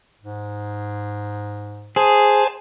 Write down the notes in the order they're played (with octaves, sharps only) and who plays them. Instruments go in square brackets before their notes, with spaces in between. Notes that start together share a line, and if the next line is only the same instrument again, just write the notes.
[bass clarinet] G#2
[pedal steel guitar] G#4 [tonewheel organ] C5 G#5 A5